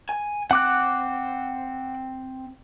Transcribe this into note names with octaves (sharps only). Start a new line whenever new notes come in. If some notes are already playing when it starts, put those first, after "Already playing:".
G#5
C4 F#5 D6 F#6